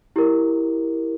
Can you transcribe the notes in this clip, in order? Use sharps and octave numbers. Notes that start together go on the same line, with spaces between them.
E4 G4 A#4